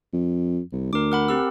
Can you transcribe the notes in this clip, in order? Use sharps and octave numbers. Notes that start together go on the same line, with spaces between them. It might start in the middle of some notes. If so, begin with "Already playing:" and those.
F2
C2
D2 A#4 D6
A#4 F#5 B5
C4 G4 E6